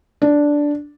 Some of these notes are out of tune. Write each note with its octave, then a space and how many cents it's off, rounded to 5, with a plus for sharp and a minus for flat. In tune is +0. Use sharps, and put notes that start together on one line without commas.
D4 -5